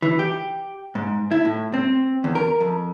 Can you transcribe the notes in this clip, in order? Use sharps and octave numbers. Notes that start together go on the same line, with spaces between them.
E3
G4
G#2
E4
A2
C4
E2
A#4
F2